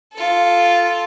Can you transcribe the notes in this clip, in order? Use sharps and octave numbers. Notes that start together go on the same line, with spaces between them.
F4 A4